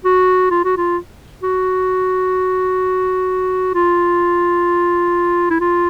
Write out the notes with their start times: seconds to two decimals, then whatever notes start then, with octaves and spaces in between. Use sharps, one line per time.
0.05 F#4
0.50 F4
0.64 F#4
0.77 F4
1.43 F#4
3.74 F4
5.50 E4
5.60 F4